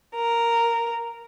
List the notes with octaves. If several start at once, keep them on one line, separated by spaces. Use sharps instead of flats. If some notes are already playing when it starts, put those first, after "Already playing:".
A#4